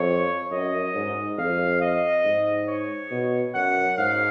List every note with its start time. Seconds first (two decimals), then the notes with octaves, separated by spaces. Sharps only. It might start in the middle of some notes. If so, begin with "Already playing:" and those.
Already playing: F2 C#5
0.51 F#2 D#5
0.94 G#2
1.38 F2 F5
1.81 D#5
2.24 G#2
2.68 C#5
3.11 B2
3.54 F#2 F#5
3.98 G#2 F5